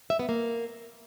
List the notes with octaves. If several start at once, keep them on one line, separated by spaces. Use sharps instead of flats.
E5
B3
A#3